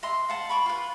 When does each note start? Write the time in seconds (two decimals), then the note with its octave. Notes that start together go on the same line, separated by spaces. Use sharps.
0.03 D#5 E5 C6
0.29 F5 F#5 A5
0.49 B5 C#6 D6
0.66 F4 B4